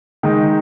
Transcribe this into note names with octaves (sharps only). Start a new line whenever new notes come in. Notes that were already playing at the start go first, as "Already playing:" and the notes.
D#3 G#3 D#4